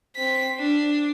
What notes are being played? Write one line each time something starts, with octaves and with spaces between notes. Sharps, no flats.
C4 B6
D4